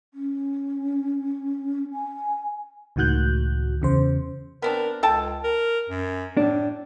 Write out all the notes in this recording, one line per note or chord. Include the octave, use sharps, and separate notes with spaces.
C#4
G#5
C#2 A2 D#3 F#4 F#6 G6
E2 C#3 C5
B3 C4 D4 A#4
C#2 A4 G5 A5
A#4
F#2
A2 D4